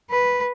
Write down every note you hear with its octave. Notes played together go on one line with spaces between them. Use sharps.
B4